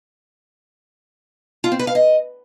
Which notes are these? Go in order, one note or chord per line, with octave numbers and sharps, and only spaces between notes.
F4
C4
B4
F5
D#5